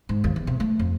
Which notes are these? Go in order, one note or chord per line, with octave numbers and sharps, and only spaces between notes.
G#2
D#2
E2
C3
A3
F2